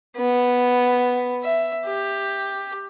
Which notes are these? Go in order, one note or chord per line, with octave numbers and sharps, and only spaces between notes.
B3
E5
G4